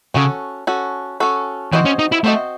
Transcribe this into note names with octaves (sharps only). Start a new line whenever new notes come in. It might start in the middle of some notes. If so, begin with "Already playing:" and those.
C#3 C#4 F#4 A4
C#4 F#4 A4
C#4 F#4 A4
E3 C4 F#4 C5 D#5
C#4
D#4
E4
A3 C4 F#4 C5 D#5